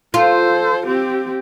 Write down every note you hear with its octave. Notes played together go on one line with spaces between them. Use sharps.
F4 A4 C5
C4 G4